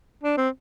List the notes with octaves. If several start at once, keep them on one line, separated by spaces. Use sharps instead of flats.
D4
C4